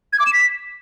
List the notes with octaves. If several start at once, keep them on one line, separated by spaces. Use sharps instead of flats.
G#6
D6
E7
B6